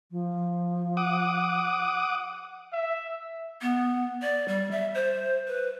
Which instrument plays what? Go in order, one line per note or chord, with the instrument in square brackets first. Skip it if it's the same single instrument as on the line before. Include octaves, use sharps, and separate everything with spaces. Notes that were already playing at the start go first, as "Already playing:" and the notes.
[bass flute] F3
[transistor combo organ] F#5 D6 D#6
[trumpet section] E5
[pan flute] B3
D5
G3
E5
C5
B4